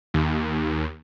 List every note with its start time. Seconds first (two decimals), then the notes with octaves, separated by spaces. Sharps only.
0.14 D#2